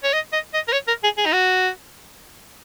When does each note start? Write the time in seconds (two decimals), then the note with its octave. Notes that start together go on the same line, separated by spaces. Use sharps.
0.04 C#5
0.13 D#5
0.33 D#5
0.54 D#5
0.68 A#4
0.73 C#5
0.88 A#4
1.04 G#4
1.18 G#4
1.26 D#4
1.33 F#4